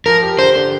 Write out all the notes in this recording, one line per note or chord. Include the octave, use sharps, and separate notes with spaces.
F3 A#4
G4
D3 C5
D3